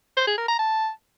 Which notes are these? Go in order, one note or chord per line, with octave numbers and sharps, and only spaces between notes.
C5
G#4
A#4
A#5
A5